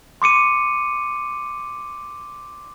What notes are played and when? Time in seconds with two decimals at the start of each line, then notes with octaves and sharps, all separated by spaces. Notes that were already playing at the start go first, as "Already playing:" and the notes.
0.22 C6 D6 C#7 D#7